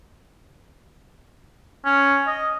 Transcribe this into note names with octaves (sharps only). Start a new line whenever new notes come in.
C#4
D#5